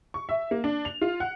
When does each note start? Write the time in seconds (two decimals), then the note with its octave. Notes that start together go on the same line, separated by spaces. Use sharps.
0.14 C#6
0.29 E5
0.51 A#3
0.64 D4
0.85 F7
1.01 F4
1.20 F#5